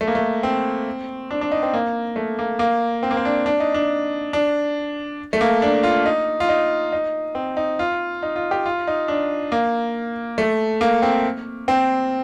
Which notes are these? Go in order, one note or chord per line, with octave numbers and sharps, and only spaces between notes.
A3
A#3
A3
C4
D4
D4
D#4
C4
A#3
A3
A#3
A#3
C4
A#3
C4
D4
D4
D#4
D4
D4
A3
A#3
D4
F4
D#4
F4
D#4
D#4
C4
D#4
F4
D#4
F4
G4
F4
D#4
D4
A#3
A3
A#3
C4
C4